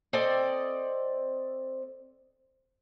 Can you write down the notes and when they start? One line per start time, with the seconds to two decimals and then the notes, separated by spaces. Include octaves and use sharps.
0.13 C4 A4 D5 D#5